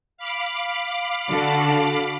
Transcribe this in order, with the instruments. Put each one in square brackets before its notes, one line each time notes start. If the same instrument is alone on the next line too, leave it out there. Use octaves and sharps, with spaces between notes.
[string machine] F5 B5 D6
[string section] D3 F#4 A4